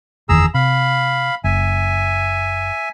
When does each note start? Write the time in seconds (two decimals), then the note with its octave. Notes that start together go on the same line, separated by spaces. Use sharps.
0.29 F#1 E2 D#3 G#4 A#5 E6
0.54 C3 F5 B5
1.44 F#1 E5 G#5